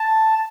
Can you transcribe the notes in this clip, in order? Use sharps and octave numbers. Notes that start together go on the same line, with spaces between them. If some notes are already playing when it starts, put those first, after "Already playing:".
Already playing: A5